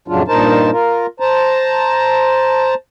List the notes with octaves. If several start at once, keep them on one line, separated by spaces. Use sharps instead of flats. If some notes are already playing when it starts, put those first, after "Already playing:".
F2 A2 C#3 F#3 D4 F4
G2 A#2 D#4 A#4 C5 A5
F4 A#4
C5 A5 A#5